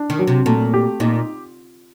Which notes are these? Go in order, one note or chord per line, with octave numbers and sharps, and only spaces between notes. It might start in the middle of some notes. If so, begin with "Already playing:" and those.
Already playing: D4
D#3
F#3
C3
A#2 A3
G4
A#2 D#4